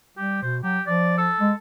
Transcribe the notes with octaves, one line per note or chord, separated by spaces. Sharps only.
G3 G4
B2 C5
F#3 G4
F3 D5
A4
G#3